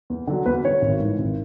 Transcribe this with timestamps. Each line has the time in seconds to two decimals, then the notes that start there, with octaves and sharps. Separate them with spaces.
0.10 E2
0.27 D3 F#3
0.46 E2 B4
0.64 D3 F#3 C#5
0.82 G#1
1.00 G#2
1.05 E3
1.19 G#1